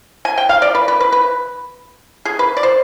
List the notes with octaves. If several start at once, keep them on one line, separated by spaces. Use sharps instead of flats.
G#5
G5
F5
D5
B4
B4
B4
B4
G#4
B4
D5
C5